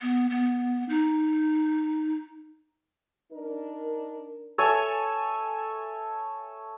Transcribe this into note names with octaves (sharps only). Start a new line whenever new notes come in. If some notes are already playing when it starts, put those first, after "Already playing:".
B3
B3
D#4
D4 D#4 A#4
A4 C#5 E5 G#5